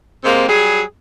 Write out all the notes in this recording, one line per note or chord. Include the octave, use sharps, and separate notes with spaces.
C3 G#3 A#3 C4
F#3 G3 G#4